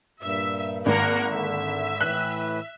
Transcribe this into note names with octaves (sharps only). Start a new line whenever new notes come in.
G2 A#2 E5
G#1 A#3 A#4 F#5
D3 E5
A2 E3 B4 F#6